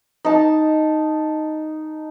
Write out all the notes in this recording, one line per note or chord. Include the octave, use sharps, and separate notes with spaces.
D#4 A5